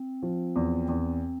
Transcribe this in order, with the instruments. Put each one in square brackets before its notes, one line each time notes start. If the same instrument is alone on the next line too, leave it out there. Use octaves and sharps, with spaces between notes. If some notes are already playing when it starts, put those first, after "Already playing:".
Already playing: [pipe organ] C4
[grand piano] F3
E2
[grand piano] E2 [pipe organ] C4